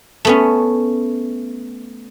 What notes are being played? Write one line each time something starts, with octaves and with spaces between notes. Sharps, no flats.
A3 B3 C#4